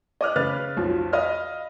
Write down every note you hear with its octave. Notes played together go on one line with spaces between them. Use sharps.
D#5 D6 F6 F#6
C#3 B4 F6 A6
B1 F2 F3
D#5 F5 B5 F6